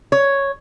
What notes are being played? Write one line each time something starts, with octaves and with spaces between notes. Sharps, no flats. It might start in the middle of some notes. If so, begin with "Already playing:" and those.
C#5